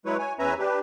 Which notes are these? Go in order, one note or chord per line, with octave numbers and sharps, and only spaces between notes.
F#3 G#3 E4 B4 C#5
C#5 G#5
E2 C#4 B4 E5 G#5 A#5
D4 G4 B4